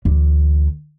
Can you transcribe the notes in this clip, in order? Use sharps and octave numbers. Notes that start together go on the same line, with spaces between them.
D2 E3